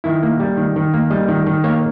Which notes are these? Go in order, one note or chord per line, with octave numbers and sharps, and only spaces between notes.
D#3 E4
A#3
G3
D#3
D#3
A#3
G3 D#5
D#3
D#3
A#3 C#5